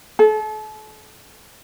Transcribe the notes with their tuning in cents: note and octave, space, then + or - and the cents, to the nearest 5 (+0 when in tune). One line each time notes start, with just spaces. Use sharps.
A4 -35